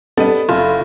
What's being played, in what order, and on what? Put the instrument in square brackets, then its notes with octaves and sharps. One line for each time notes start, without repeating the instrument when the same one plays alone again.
[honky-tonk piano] G3 B3 D4 [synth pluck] A4 D#5
[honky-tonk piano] F#1 [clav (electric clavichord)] E4 F4 [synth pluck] A4